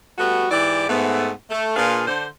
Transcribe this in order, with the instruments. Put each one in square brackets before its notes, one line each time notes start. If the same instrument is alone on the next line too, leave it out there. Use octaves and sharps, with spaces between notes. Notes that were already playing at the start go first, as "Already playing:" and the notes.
[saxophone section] G3 A3 B3 F#4
G#2 E3 G4 D5
G#2 A3 B3
A3
A#2 D4 F4 G#4 B4 F5
D3 C5